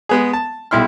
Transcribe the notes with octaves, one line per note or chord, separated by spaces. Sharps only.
G#3 B3 G#4
A5
B1 G3 E4 C6 F6